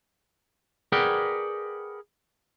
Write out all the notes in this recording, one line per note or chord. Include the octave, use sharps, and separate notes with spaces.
G#4 A#4 B4 D5 F#5 G5